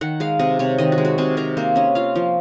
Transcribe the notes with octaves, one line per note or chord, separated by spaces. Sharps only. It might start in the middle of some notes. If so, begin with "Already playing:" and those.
D#3 F#5
G#3 F5
C3 D#5
C3 C#5
D#3 D#5
F#4
G#3
F#4
C3 G#4
C3 A#4
A#3 C5
C#4 D#5
F4 F5
F3